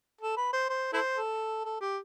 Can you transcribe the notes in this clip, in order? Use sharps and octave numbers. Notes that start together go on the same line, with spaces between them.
A4
B4
C5
C5
E4 A4 C5
A4
A4
G4